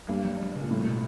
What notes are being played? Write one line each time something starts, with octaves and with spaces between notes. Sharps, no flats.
G2 A#3
F#3
G#3
C#3
A#2
A2 G3
B2